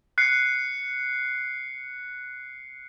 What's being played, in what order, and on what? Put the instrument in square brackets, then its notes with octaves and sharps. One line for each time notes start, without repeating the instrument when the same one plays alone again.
[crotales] F#6 C7 C#7